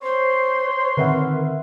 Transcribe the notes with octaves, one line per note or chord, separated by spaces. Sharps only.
C5 C#5 C6
D3 D#3 C4 A#4 B4 E5 F#5